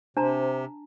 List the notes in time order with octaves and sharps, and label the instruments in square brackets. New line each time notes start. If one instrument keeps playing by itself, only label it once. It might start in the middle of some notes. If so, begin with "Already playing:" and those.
[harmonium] C3 [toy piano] D4 A5 A#5 [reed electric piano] C5